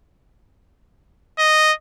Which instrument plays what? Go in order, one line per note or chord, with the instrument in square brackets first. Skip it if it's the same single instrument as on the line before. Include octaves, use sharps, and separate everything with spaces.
[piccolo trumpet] D#5